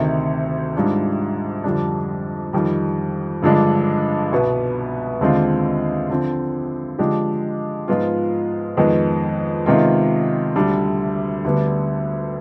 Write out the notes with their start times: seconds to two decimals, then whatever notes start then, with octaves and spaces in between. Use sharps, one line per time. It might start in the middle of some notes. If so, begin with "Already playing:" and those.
Already playing: D2 C3 D#3
0.75 G#2 G3 D4 F4
1.64 F2 D3 G3 D4
2.53 F2 D#3 G3
3.42 G2 D3 F3 G#3 D4
4.31 C2 B2 B3
5.21 D#2 D3 G#3 C4 F4
6.10 D3 F3 C4
6.99 D3 F3 G#3 D4 G4
7.88 G#2 F3 G#3 B3 F4
8.77 F2 D#3 G#3 B3
9.66 C3 D#3 G#3 B3 F4
10.56 D2 D3 G3
11.44 D2 D3 G3 B3